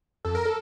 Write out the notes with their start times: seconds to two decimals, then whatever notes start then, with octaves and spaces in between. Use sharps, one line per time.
0.25 F2 A4
0.35 A#4
0.45 A4